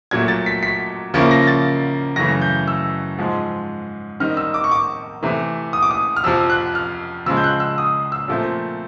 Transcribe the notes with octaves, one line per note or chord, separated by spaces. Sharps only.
A#2 F#3 A3 G#6
A6
B6
B6
C#3 F3 A#3 C#4 E4
A#6
A6
F#2 C#3 E3 A3 A#6
G6
E6
G#2 F3 G#3
D#3 G3 C4 D#4 F6
E6
D6
C#6
D6
C3 E3 A3
D#6
D6
D#6
F6
F2 C3 F3 E6
F#6
F6
C#3 F3 G#3 E6
G6
F#6
E6
D#6
E6
A#2 F3 A3 C4